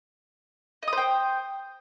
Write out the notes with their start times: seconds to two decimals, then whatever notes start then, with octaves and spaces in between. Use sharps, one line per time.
0.83 D#5
0.88 D#6
0.93 C5
0.97 G5